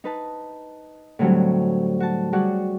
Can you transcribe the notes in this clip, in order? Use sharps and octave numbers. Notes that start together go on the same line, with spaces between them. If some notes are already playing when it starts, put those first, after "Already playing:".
D#4 B4 A5
A2 D3 F#3 G3 C4
F#4 A5
G3 F#4 G#4 C#5 D5 F#5